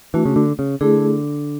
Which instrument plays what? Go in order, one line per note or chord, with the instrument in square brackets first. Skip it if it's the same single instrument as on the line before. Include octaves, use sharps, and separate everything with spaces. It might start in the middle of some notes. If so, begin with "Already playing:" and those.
[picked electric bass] E3 [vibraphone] A3 D4 F#4
[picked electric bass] C#3
D3
C#3
[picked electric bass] D3 [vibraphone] A3 E4 G#4